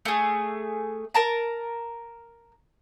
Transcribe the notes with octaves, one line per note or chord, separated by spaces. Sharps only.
A3 G#4
A#4 A5 A#5